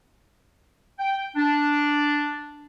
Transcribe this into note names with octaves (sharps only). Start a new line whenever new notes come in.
G5
D4